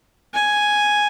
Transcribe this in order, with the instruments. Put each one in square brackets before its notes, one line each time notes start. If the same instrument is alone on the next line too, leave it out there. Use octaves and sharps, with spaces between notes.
[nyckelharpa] G#5